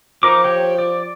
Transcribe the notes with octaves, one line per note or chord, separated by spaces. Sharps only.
F3 D#4 A#4 D6
G4 C#5 G5
D5